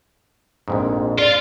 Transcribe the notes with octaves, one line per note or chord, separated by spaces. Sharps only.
A#1 F2 G#2
F4 D5